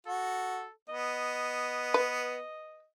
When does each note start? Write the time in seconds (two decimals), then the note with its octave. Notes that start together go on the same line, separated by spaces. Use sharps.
0.07 F#4 A4
0.89 B3 D#5
1.94 B4